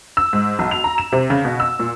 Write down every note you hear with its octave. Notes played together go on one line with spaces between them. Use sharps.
E6
G#2
B1
F7
A#5
E7
C3
C#3
B2
E6
A#2